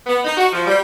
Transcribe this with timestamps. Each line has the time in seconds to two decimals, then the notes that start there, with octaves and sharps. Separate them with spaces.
0.07 B3
0.25 D#4
0.37 F#4
0.53 F3
0.67 G3